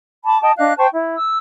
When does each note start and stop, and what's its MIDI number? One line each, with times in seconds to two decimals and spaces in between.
0.25 0.40 81
0.25 0.40 83
0.25 0.40 86
0.42 0.52 75
0.42 0.52 79
0.42 0.52 81
0.42 0.52 87
0.57 0.73 62
0.57 0.73 75
0.57 0.73 77
0.57 0.73 90
0.77 0.87 72
0.77 0.87 79
0.77 0.87 81
0.77 0.87 85
0.92 1.15 64
1.15 1.37 88